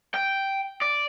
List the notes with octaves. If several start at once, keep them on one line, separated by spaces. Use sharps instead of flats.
G5
D5